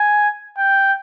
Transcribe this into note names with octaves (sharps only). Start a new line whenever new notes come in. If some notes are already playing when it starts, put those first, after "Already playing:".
Already playing: G#5
G5